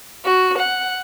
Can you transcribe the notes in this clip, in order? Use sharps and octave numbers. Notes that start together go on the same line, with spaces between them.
F#4
F#5